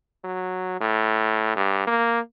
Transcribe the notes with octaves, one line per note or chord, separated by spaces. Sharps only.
F#3
A2
G2
A#3